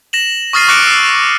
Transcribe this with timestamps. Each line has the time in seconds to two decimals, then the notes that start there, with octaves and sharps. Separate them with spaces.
0.13 A#6 E7 F#7
0.53 C#6 D#6 F6 A6 C7 D#7
0.68 C#6 D6 F#6 A#6 C#7 D7
0.87 D6 E6